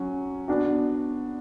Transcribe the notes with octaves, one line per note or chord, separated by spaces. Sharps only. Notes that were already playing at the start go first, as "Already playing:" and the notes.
Already playing: F#3 C#4
B3 D4 F#4